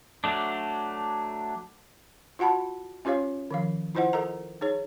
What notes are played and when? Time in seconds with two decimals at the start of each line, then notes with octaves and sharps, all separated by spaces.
0.24 F#3 A3 D4
2.39 F4 F#4 F#5 A5 B5
3.05 C#4 F4 G4 C#5 F5
3.51 D#3 F3 F5
3.95 E4 F4 C5 D#5 F#5
4.13 A4 A#4 D#5 A#5
4.61 D#4 G#4 C#5